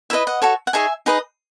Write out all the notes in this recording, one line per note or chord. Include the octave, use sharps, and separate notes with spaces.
E4 B4 D#5 E5
D#5 F#5
F#4 A4 C#5
F#5
D#4 G#4 C#5 E5 G#5
D#4 G#4 B4 D#5